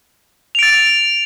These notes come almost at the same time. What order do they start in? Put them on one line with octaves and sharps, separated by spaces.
F7 D7 A6